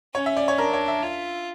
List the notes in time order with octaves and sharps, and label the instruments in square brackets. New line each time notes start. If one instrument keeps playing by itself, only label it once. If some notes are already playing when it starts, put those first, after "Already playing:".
[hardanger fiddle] C#4 [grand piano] C#5
[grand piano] E5
D5
C#5
[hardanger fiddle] D4 [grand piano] A#4
[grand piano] C#5
E5
[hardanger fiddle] F4